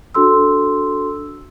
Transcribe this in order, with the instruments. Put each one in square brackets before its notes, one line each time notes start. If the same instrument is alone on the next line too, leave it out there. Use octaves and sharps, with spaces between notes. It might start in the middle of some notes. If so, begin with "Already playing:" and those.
[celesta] D4 F#4 A4 C6 E6